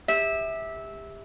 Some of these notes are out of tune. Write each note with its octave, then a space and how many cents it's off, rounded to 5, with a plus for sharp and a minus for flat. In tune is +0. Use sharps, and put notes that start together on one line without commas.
G4 +35 E5 -15